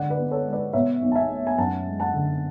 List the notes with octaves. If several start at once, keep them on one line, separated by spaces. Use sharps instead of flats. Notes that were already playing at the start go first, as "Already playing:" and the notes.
Already playing: D3 G#3 D5 F#5
B4 D5
B3
A4 C#5
G#3
B4 D5
B2 C#5 E5
B1
A5
E5 G#5
A3
G#5
F#2 F#5 A5
G#3
F#5 A5
D3